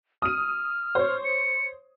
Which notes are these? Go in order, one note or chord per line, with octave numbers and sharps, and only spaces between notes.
D#6 F6 D#7
C5 C#5
C#7